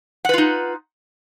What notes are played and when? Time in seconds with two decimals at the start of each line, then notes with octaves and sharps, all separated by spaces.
0.25 F#5
0.29 B4
0.34 F4
0.38 D#4